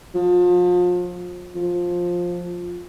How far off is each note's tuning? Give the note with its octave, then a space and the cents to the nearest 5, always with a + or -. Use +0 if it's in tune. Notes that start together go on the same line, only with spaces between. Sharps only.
F3 +35
F3 +10